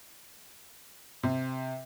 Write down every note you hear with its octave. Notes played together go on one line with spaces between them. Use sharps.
C3